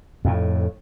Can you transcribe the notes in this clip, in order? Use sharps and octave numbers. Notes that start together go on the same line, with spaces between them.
F2 A2